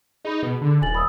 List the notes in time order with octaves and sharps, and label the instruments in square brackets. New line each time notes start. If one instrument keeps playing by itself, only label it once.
[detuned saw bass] D#4 [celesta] G#4 B5
[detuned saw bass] B2
D3
[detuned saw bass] D#1 [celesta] G#5 A6 F#7
[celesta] B5 D#6 E6